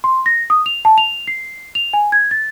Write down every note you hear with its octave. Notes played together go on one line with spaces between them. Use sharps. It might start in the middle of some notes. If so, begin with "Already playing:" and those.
C6
A#6
D#6
F7
A5
F7
C7
F7
G#5
G#6
A6